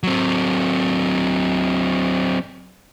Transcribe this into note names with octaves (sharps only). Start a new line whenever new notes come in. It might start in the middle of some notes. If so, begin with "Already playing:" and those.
F#3 C4